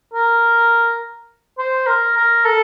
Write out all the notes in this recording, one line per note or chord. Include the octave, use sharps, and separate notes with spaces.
A#4
C5
A#4
A#4
A4